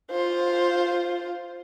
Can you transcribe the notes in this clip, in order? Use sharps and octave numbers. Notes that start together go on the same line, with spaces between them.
F4 C5